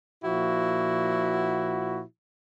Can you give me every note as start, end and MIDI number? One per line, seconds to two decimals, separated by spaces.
0.24 2.01 46
0.24 2.01 53
0.24 2.01 64
0.24 2.01 66